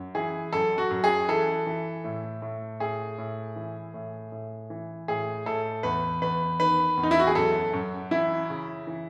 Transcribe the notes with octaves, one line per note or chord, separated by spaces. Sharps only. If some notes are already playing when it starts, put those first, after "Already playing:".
Already playing: F#2
E3 G#4
F#2 A4
F#4
F#2
G#4
E3 A4
E3
A2
A2
A2 G#4
A2
E3
A2
A2
E3
A2 G#4
A2 A4
E2 B4
E2 B4
D#3 B4
E2
D#4
E4
F#4
G#4
F#2 A4
F#2
E3 E4
C#3
E3